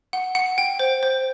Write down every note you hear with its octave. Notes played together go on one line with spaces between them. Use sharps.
F#5
F#5
G5
C5
C5